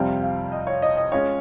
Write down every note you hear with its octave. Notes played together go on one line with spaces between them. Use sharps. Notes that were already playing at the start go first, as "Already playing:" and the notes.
Already playing: F2 C3 G3 C4 F4 G5
F5
D#5
C#5
D#5
D#5
G#3 C#4 F4 G#4 C#5 D#5